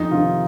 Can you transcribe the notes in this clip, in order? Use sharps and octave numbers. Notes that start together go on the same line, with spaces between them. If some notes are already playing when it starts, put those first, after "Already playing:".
Already playing: F2 D#4
C3 D#3 F4